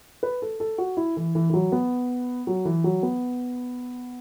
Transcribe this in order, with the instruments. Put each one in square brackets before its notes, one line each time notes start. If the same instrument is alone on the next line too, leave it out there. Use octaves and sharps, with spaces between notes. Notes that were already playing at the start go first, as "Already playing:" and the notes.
[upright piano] B4
A4
A4
F#4
E4
E3
E3
E3
F#3
B3
F#3
E3
F#3
B3